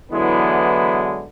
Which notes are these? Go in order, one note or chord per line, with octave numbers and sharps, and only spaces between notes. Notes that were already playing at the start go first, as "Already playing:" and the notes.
D3 E3 F#3 G#3 B3 E4